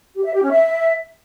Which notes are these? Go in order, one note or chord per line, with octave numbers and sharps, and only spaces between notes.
G4
E5
G4
C#4
E5